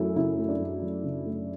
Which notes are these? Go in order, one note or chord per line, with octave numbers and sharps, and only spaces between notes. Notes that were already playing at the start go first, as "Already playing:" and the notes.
Already playing: F#2 F#3 A3 E4
C#3 E4
A3
D4
F#2
F#3
C#3
A3